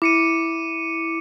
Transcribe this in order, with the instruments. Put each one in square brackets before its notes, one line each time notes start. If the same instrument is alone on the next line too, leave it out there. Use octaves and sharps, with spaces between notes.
[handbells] E4 [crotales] D6 C#7 D#7